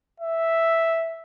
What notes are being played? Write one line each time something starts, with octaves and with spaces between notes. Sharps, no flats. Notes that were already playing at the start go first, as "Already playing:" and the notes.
E5